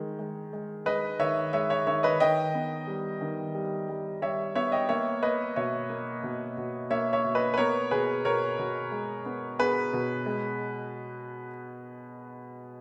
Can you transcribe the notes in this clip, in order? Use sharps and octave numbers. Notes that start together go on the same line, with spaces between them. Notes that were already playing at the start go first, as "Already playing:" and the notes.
Already playing: D#3 G#3
G#3
G#3
G#3 B4 D#5
D#3 C#5 E5
G#3 C#5 E5
C#5 E5
D#3 C#5 E5
B4 D#5
D#3 D#5 G5
B3
G3
D#3
G3
G3
G3 C#5 E5
B3 C#5 E5
D#5 G5
A#3 C#5 E5
A#3 B4 D#5
B2 C#5 E5
A#3
B2
B2
A#3 C#5 E5
C#5 E5
B2
B4 D#5
B4
B3 A#4 C#5
B2 G#4 B4
B2 A#4 C#5
B2
G#3
B3
B3 G#4 B4
B2
G#3